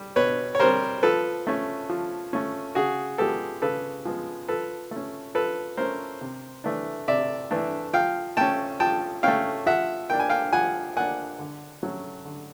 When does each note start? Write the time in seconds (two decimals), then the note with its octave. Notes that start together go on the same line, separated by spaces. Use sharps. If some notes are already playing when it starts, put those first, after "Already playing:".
Already playing: G3
0.16 B2 B4 C#5
0.55 C#5
0.59 G3 C4 A#4 C5
1.03 F3 A4 B4
1.47 A3 C#4
1.89 F3
2.33 A3 C#4
2.75 C#3 F#4 G#4
3.18 F3 G#3 B3 G4 A4
3.62 C#3 A4 B4
4.05 F3 G#3 B3
4.48 F3 A4 B4
4.91 A3 C#4
5.35 F3 A4 B4
5.77 A3 C#4 A#4 C5
6.21 C3
6.64 E3 A3 D4
7.08 C3 D5 E5
7.51 E3 A3 D4
7.93 F3 F5 G5
8.37 A3 C#4 G5 A5
8.80 F3 G5 A5
9.23 A3 C#4 F5 G5
9.66 F3 E5 F#5
10.10 A#3 D4 G5
10.20 G#5
10.30 F5 G5
10.53 F3 F#5 G#5
10.96 A#3 D4 F#5 G#5
11.39 D3
11.83 F#3 A3 C#4
12.25 D3